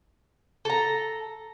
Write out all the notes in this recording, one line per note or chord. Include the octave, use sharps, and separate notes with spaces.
A4 A#5